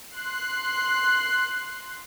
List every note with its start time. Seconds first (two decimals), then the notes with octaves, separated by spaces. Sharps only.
0.14 C6 F#6 C7